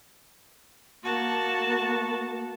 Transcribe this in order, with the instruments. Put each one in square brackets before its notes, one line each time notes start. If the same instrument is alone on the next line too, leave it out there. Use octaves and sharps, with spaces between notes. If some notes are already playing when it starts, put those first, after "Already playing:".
[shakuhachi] A#3 [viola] F#4 A5